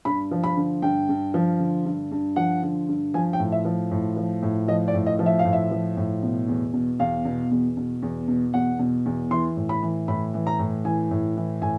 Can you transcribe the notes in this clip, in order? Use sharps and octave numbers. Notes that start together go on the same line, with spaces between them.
G2 B5
F3
B5
D3
G2 G5
G2
F3
D3
G2
G2
F3 F#5
D3
G2
F3 G#5
G5
A2
E5
F3
A2
F3
A2
F3 D#5
D5
A2
D#5
F3
E5
F5
A2
E5
F3
A2
B2
E2
B2
E2 F5
B2
E2
B2
E2
B2
E2 F#5
B2
E2
E3 C6
A2
B5
E3
A2 B5
E3
A#5
A2
E3 G#5
A2
E3
A2 G#5